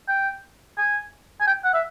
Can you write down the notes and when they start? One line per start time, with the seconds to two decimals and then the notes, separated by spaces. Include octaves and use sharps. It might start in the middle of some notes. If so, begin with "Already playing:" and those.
0.09 G5
0.78 G#5
1.41 G#5
1.47 G5
1.64 F#5
1.74 E5